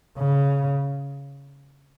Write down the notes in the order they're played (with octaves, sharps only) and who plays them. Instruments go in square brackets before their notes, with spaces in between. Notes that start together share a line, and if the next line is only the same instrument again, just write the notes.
[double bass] C#3